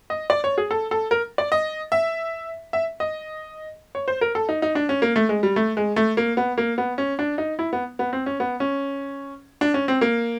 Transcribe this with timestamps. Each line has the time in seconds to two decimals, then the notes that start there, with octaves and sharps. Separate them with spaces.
0.10 D#5
0.30 D5
0.44 C#5
0.58 G#4
0.71 A4
0.91 A4
1.11 A#4
1.38 D5
1.52 D#5
1.92 E5
2.73 E5
3.00 D#5
3.95 C#5
4.08 C5
4.21 A#4
4.35 A4
4.49 D#4
4.62 D#4
4.75 D4
4.89 C#4
5.02 A#3
5.16 A3
5.29 G#3
5.43 G3
5.56 A3
5.77 G#3
5.96 A3
6.17 A#3
6.37 B3
6.58 A#3
6.78 B3
6.98 C#4
7.19 D4
7.38 D#4
7.59 E4
7.73 B3
7.99 B3
8.13 C4
8.26 C#4
8.40 B3
8.60 C#4
9.61 D4
9.74 C#4
9.88 C4
10.01 A#3